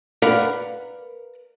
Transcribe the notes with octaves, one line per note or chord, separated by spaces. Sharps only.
A#4 B4 D5 F5 F#5 A#5